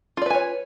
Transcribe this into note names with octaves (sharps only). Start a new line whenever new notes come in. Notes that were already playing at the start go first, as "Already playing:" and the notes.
F4 B4 C#5 D5 G#5